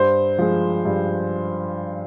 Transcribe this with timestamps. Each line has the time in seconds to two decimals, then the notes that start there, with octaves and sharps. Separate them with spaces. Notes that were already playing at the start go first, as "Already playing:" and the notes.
Already playing: G2 C5
0.38 F3 G#3
0.85 G2